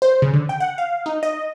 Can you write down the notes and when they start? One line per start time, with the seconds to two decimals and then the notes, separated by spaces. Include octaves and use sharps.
0.02 C5
0.22 C#3
0.34 D3
0.49 G5
0.60 F#5
0.78 F5
1.06 D#4
1.23 D#5